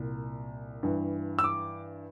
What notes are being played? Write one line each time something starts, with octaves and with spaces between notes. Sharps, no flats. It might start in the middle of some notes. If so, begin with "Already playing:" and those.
Already playing: C2 A#2
G2 E3
E6
D6